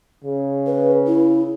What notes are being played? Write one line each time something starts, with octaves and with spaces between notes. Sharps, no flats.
C#3
B4
E4